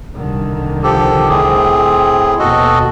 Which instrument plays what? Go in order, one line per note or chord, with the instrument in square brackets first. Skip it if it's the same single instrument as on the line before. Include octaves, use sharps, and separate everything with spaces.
[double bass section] C2 D3 D#3
[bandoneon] F3 G4 A4
A2 C4 G#4
[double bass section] D#2 B2 [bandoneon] F#4 A4 D#5